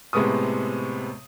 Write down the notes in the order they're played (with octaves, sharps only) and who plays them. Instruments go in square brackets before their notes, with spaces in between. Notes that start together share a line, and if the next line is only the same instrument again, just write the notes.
[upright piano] A2 C3 G#3 B3 C#6 D#6